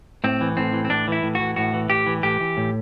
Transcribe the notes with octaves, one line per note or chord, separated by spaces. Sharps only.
A2 C4
E3
A2 C4
E3
C4
A2 D4
E3 E4
A2
E3 F#4
A2 F#4
E3
A2 G4
E3
A2 G4
E3
A2